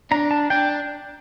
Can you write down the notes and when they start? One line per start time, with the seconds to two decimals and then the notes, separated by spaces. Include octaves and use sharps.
0.11 D4 A#5
0.31 A5
0.50 D4 G5